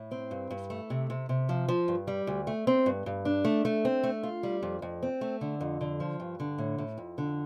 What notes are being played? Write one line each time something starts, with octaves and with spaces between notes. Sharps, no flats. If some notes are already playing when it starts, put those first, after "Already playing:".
Already playing: A2
C4
G2
G2
A3
C3
C3
C3
F3
F3
G2
G3
D2
A3
C4
G2
G2
D4
A3
A3
C4
A3
F4
G3
F2
F2
C4
A3
D3
F2
D3
F3
G2
D3
A2
A2
F2
D3